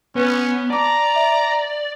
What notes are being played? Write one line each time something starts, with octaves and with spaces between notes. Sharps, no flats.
B3 C#4 B4
D5 A5 A#5 D6
E5